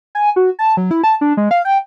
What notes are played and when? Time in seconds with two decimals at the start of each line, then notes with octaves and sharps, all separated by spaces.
0.15 G#5
0.36 F#4
0.59 A5
0.77 F#3
0.91 E4
1.04 A5
1.21 D4
1.37 G#3
1.51 F5
1.65 G5